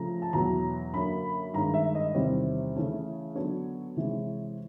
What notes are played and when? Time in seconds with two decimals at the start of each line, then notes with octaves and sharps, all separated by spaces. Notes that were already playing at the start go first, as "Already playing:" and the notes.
Already playing: C#3 F3 A3 A#5
0.22 A5
0.33 E2 B2 F#3 A#5
0.93 F#2 D3 F#3 A#3 B5
1.53 G2 D#3 G#3 C#4 A#5
1.74 E5
1.95 D#5
2.14 E2 C3 D#3 G3 C4 C#5
2.75 C#3 E3 A3 C#4
3.35 D3 F#3 B3 D4 C#5
3.96 C3 E3 G#3